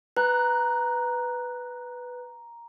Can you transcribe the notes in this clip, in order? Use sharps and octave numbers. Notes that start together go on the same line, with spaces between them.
B4 A#5 F#6